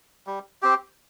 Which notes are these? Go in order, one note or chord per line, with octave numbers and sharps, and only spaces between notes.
G3
C4 G4